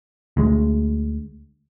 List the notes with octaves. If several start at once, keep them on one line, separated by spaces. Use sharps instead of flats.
D2 G#3